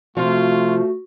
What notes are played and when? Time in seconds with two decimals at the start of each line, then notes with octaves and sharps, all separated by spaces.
0.17 C3 F3 A3 F4 F#4